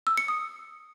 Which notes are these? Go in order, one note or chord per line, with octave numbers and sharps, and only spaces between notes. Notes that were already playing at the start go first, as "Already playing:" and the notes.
E6
C#7
D#6